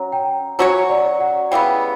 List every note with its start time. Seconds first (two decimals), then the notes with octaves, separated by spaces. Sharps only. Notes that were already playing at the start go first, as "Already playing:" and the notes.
Already playing: F#3 C#4 A#5
0.12 G5
0.59 F#3 C#4 F#4 C#5 F#5
0.89 D5
1.20 F#5
1.51 C#3 E3 G3 B3 G5